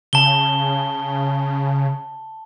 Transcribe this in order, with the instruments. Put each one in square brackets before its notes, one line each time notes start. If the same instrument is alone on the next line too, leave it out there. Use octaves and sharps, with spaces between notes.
[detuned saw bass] C#3 [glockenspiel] A5 G7